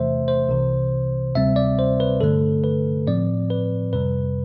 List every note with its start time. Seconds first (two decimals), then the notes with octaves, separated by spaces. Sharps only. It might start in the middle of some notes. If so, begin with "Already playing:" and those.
Already playing: E2 C3 E3 A3 C5 E5
0.28 C5
0.49 C2 C3 E3
1.35 D2 C3 G3 C4 E5
1.56 D5
1.79 C5
2.00 B4
2.21 G2 D3 A3 A4
2.64 B4
3.07 A2 F3 C4 D5
3.50 B4
3.93 F2 C3 G3 B4